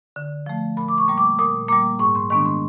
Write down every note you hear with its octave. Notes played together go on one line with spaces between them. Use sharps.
D3
F3 A3
A#2 B5
D6
C#6
G3 A#3
D6
A#2 D#6
G3 A#3 D6
G#2 C#6
C6
D#3 G#3 B3 D4 C#6
C6